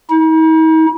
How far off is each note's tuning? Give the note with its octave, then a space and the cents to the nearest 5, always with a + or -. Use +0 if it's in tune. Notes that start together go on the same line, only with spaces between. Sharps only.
D#4 +45